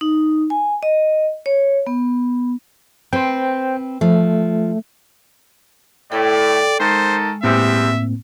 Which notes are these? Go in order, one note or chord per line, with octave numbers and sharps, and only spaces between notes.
D#4
G#5
D#5
C#5
B3
C4 B4 C5 G5
F3 A3
A2 A4 D5 G5
D#3 G#3 A4 C5
E2 A2 C3 A#3 C4 E5